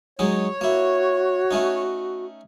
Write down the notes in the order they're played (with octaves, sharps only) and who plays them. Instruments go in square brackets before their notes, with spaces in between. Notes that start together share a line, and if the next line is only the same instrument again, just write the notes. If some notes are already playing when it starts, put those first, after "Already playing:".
[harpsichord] F#3 G#3 D#4 [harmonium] C#5
[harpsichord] A#3 E4 [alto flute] F#4
[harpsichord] A3 C#4 D#4